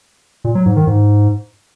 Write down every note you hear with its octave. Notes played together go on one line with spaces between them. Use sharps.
A#2
F#3
G#2
D#3
G#2